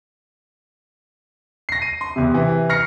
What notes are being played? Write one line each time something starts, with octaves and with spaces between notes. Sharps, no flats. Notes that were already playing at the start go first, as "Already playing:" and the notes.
A#6 C7
D#7
C6
E2 C3
C3 E3
C#6 F6 A#6 C7 C#7